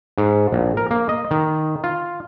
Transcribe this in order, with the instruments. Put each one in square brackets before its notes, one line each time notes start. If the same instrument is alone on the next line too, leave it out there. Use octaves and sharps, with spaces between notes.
[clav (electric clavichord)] G#2
A#1
A#4
A#3
D#5
D#3
F4